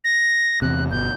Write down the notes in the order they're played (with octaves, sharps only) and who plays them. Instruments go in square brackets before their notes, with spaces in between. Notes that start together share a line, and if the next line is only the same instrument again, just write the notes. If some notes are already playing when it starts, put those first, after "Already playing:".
[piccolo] A#6
[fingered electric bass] E2 C3 [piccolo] F#6
[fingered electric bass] G1 B2 [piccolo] G6